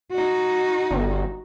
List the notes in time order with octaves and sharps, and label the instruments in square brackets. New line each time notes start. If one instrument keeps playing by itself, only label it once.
[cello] D#4 F#4
[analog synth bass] G1